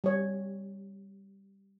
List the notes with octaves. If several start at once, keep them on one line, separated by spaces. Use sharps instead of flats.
G3 C#5